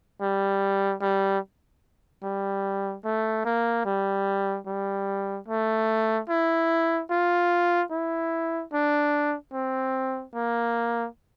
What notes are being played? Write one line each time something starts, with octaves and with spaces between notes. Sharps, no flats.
G3
G3
G3
A3
A#3
G3
G3
A3
E4
F4
E4
D4
C4
A#3